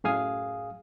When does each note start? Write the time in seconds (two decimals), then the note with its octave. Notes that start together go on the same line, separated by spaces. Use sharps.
0.04 F#2 A2 G#4 F5 G#5 D#6